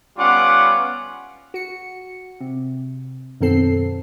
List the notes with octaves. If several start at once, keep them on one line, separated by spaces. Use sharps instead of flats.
G3 B3 C#4 F4 F#5 D6
F#4 C#7
C3
F#2 B2 D#3 C4 A4 C7